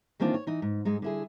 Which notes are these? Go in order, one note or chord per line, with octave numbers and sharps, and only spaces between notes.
D#3 E3 A#3 C4 D4 F4
C#5
E3 D#4
G#2
G#2 G#3 D#4
D3 E4 G#4